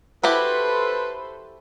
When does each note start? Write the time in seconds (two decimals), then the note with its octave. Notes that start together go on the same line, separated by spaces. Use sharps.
0.23 E4 F#4 G4 A4 B4 C5 B5